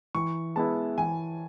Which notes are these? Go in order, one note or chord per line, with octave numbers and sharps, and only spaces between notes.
E3 C#6
G#3 B3 E4 A5
E3 G#5